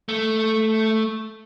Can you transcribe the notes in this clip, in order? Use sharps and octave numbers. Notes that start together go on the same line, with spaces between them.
A3